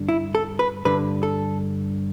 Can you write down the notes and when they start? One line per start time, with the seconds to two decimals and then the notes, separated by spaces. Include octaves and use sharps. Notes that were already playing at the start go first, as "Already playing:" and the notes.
Already playing: G2 D3
0.09 E4
0.35 A4
0.59 B4
0.85 G2 D3 B4
1.23 A4